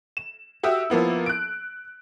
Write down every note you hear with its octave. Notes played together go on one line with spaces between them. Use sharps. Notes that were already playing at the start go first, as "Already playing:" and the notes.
E7
F#4 G4 E5 D#6 E6
F3 A#3 B3 E4
F#6 D7